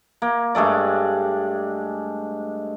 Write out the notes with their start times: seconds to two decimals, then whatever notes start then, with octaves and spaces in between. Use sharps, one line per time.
0.22 A#3
0.55 G2 G#3 A3 D5